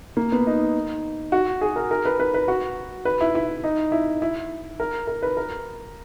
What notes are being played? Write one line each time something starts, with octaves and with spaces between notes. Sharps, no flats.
A#3
B3
D#4
F#4
G#4
A#4
A#4
B4
B4
B4
F#4
B4
E4
E4
D#4
E4
E4
A#4
A#4
B4
A#4